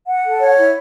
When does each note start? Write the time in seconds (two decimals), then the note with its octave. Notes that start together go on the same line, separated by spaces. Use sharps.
0.08 F#5
0.24 A4
0.41 C#5
0.57 E4